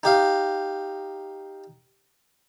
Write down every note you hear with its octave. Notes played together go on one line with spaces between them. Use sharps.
D#4 G4 F5